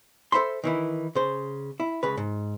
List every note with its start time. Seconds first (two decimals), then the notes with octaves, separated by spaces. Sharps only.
0.32 A4 C5 E5 B5 C6
0.64 D#3 E3 E4
1.15 C#3 C5
1.80 E4
2.03 C#2 C#3 B4
2.17 G#2